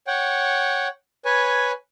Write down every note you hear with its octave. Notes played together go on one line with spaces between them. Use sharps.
C#5 F#5 G5
B4 C#5 G#5